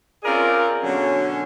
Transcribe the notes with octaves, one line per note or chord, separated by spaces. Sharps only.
C4 C#4 F4 G#4 A#4 D5
B2 D3 F#3 C#4